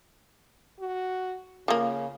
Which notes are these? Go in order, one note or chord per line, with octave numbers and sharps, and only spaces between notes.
F#4
C#3 F3 A#3